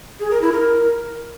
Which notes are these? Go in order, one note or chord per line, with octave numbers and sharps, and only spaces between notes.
G#4
A#4
E4
A#4